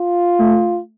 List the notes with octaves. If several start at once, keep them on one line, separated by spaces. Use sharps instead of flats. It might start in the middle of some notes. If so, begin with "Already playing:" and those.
Already playing: F4
A3